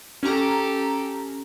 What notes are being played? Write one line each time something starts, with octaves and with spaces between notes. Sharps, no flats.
C#4 G4 A4 A#5